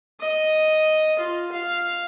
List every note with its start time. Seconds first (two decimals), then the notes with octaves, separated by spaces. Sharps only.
0.20 D#5
1.19 F4
1.52 F5